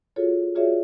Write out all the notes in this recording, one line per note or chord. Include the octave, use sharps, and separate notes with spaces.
F4 F#4 G#4 A4 C#5
F4 F#4 G#4 C#5 D5 E5